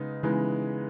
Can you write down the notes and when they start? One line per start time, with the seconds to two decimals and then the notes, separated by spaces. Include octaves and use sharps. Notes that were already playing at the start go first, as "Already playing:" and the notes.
Already playing: C#3 G#3 B3 D#4
0.23 C#3 E3 G#3 B3 D#4